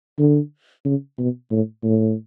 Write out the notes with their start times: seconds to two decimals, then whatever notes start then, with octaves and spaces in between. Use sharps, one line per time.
0.19 D3
0.85 C#3
1.18 B2
1.51 A2
1.84 A2